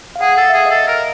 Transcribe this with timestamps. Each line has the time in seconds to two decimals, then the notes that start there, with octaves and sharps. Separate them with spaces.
0.16 F5
0.21 G#4 F#5
0.32 F#5
0.37 A4
0.43 F5
0.49 E5
0.54 G#4 F5
0.66 D#5
0.71 A4 E5
0.88 A#4 D#5